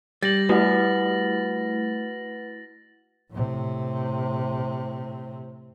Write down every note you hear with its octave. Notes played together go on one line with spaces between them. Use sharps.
G3 A6 A#6 F#7
A3 E4 F#4 B4 F#5
A2 C3